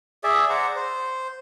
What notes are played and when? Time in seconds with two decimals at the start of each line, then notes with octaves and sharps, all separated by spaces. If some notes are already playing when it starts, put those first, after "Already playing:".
0.24 G#4 D5 E5
0.50 C5 D5 F#5 A#5
0.76 C5